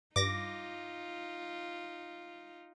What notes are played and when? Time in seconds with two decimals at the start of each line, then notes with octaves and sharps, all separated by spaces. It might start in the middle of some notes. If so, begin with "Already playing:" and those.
0.16 G2 D#4 F4 D6 A#6